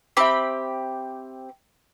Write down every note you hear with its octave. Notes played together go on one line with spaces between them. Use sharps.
C4 G4 E5 B5 D6